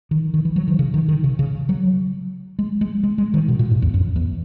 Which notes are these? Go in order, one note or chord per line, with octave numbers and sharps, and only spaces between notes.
D#3
D#3
E3
F#3
D#3
C#3
D#3
D#3
C#3
C#3
F#3
G#3
G#3
G#3
G#3
D#3
B2
A#2
G#2
E2
F#2
E2